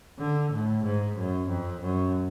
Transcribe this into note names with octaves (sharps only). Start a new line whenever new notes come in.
D3
A2
G#2
F#2
F2
F#2